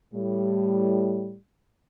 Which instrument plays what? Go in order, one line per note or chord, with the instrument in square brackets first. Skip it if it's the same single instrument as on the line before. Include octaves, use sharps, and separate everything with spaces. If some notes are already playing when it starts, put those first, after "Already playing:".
[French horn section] A2 G3